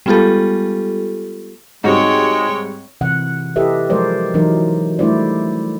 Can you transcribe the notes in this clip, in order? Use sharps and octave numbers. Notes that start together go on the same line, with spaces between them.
G3 G#3 B3 F4 G4 A4
G#2 G3 G#3 C4 D#4 F#4 C#5 G5
C3 E3 F#5
E4 G4 A4 B4 D#5 E5
F3 F#3 G#3 A#4 C5 D5
E3 F#3 D#4 A#4
G3 A3 D4 E4 C5 D5